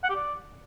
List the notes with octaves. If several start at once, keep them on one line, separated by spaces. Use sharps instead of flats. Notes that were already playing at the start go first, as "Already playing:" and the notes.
F#5
G4
D5